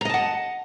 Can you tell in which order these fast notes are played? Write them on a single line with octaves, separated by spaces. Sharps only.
A#5 D#5 A5 F#5